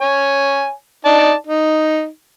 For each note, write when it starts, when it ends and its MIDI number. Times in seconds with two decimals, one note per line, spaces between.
0.01 0.72 73
0.01 0.72 80
1.05 1.33 63
1.05 1.33 74
1.05 1.33 81
1.47 2.07 63